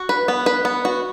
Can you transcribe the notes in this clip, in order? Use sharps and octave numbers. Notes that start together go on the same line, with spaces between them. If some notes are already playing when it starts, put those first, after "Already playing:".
Already playing: F#4
B4
B3
B4
B3
F#4